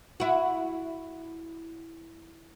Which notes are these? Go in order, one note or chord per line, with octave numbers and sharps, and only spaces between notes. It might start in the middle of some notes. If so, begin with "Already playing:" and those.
E4 F#4